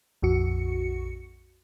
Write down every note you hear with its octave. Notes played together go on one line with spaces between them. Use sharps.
A#1 F2 F#4 C#7